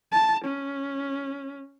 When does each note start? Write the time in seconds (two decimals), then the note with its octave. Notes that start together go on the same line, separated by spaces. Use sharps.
0.12 A5
0.44 C#4